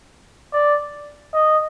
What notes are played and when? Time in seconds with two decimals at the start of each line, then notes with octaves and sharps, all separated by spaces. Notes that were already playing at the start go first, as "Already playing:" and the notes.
0.53 D5
1.33 D#5